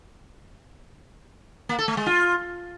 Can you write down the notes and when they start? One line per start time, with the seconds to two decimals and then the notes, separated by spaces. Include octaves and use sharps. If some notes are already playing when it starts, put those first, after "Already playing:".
1.69 A#3
1.79 A4
1.88 A3
1.97 G#3
2.06 F4